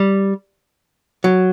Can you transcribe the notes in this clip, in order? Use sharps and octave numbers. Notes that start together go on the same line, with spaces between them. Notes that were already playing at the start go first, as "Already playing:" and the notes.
Already playing: G3
F#3